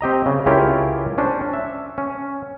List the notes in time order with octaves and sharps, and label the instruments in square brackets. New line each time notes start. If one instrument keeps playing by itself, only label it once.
[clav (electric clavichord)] C4 G4 D#5 A#5
C#3
C#2 C#4 E4 F4 G4 A#4
C#4 D4 C5
E5
C#4